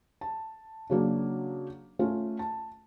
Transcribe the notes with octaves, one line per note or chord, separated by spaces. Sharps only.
A5
C#3 F#3 A#3 D4
A3 C#4 F4
A5